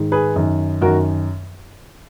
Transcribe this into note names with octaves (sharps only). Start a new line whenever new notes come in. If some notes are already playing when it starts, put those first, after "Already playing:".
Already playing: G#2 D#3
G#4 B4
F#2 D#3
F#2 D#3 F#4 A#4